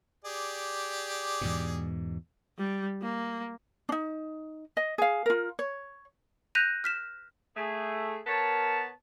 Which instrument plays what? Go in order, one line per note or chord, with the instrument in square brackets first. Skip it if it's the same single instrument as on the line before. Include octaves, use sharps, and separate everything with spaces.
[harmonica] G4 G#4 D5
[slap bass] E2 G#2 B2
[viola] G3
A#3
[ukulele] D4 D#4
D#5
G#4 F5
F4 A#4
C#5
[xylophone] F#6 G6 A#6 B6 D#7 F7
F6 B6 E7
[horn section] A3 G#4
B3 A#4 C#5 A5